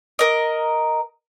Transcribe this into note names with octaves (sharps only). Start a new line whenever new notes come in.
A#4 D#5